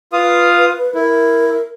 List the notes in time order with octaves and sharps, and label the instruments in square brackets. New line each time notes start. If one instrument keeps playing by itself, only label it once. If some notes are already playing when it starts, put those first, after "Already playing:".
[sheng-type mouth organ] F4 F5 D#6 [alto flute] B4
[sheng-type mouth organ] E4 [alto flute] A#4